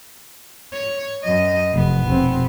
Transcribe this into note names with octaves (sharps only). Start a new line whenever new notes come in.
C#5
F#2 D#5
F1 B3
F1 B2 C4